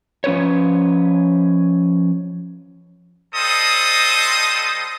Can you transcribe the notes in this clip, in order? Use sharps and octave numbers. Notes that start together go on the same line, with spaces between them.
F3 C#4 B4 C#5
G3 A4 C5 D#5 D#6